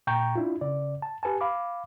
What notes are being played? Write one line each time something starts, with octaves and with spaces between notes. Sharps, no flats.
A#2 G5 A#5 C#6 G6
D4 E4 F4
C#3 D5
A5
G4 B4 G#5 A5
F5 B5 D6